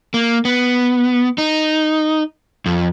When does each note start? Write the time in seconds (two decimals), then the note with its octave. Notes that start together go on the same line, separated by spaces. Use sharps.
0.14 A#3
0.45 B3
1.38 D#4
2.66 F2